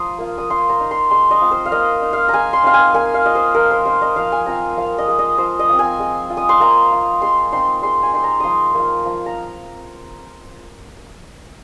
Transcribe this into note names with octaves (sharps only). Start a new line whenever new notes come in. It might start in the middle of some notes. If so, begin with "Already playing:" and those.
Already playing: F3 A#5 C6 D#6
A#3 F4
D#6
A#3 C6
A#5
D#4
C6
G#3 C6
D#5
C4 F4
C5
F5
A#3 D#5
D#4
F5
G#3 G#5 A#5
C6
C4 D#4 F5
G#5
A#3 G#5
F5
F4 D#5
C5
F3 A#4
C5
A#3 D#4 C5
D#5
F3 F5
G#5
C4 F4 A#5
F3 F5
D#5
G#3 F4
D#5
F3 C5
D#5
C4 F4
G#5
G#3
F4
D#6
C6
A#3 A#5
F4
G#3 C6
C4 D#4 C6
G#3 C6
G#5
D#4 C6
A#5
F3 C6 D#6
A#3 F4
F3
A#5